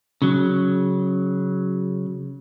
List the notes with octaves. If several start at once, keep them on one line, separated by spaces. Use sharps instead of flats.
C#3 F#3